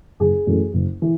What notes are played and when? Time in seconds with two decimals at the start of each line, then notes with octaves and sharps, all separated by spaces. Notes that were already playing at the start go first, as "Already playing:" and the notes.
0.20 F#1 G#4
0.47 F#2 E3 A3
0.73 F#1
1.02 E3